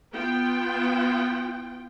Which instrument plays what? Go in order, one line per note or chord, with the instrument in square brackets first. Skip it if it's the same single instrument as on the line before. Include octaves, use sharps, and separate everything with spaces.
[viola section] B3 F4 G5